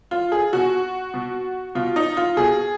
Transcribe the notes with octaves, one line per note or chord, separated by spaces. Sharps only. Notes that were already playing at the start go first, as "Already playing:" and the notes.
F4
G#4
B2 F#4
B2
B2 F4
D#4
F4
B2 G#4